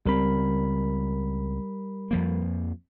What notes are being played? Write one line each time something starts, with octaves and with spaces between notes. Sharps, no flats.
C#2 C#3 G3 C4 A#4 B5
F2 F3 A#3